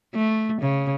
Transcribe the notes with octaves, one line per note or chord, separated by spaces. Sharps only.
A3
C#3